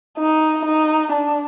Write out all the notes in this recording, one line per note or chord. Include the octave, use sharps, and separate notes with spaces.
D#4
D#4
D4